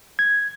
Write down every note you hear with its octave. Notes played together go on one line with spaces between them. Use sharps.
G#6